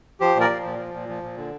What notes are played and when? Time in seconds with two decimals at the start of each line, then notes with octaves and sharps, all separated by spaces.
0.20 F3 G4 C5
0.35 A#2
0.40 A#4 D5
0.49 F3
0.65 A#2
0.78 F3
0.94 A#2
1.09 F3
1.23 A#2
1.37 D3